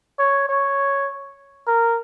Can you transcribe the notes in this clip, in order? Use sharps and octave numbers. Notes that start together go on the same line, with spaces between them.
C#5
C#5
A#4